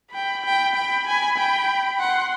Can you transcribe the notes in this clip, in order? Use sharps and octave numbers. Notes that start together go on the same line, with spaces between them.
G5 B5
G5
G5
G#5
G5
F#5 C6